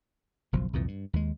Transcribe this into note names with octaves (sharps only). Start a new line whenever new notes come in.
F#1 B1 F3
C2 F2 A#2 E3
G2
D#2 G#3